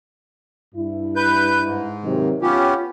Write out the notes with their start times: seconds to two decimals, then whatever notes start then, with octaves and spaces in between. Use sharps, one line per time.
0.74 G2 E4
1.16 B4 G6
1.64 G#2
2.04 C3 D#3 F#3
2.42 B3 C#4 F4 G4